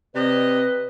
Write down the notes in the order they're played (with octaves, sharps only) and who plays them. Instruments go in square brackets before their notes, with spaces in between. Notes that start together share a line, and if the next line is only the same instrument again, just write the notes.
[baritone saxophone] C3 [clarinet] B4 [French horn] D5 [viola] D#5